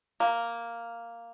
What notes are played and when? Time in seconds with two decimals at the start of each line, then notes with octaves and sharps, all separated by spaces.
0.20 A#3